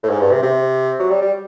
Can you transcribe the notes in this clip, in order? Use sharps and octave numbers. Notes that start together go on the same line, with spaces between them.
A2
G#2
G2
C3
C3
F#3
G3
G3